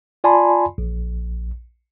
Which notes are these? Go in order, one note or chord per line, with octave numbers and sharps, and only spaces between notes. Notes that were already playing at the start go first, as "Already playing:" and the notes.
F4 D5 G#5 A5 B5 C6
A#1